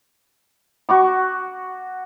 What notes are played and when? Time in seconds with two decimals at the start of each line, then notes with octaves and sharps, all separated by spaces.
0.89 F#4 C#6 D6